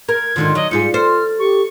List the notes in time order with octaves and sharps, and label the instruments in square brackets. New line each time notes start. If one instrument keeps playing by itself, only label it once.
[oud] A#4 [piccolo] G#6
[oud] G#2 D3 F3 [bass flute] D#3
[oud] F#3 [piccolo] D#5
[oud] G#2 G3 G#4 [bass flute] F4 [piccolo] C#7
[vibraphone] A4 [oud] C5 [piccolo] F6
[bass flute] G4 [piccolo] C#6